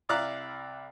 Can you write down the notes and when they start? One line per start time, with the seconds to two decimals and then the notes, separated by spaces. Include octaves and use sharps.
0.09 C2 E4 D5 F5 A#5 F#6